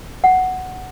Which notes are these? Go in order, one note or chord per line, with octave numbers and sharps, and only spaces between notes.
F#5